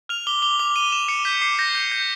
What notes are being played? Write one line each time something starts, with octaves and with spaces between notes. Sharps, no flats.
F6 F7
D6 G7
D6 G7
D6 F7
D6 D#7
D6 E7
D6 C#7
G6 B6
D6 C7
G6 A#6
G6
G6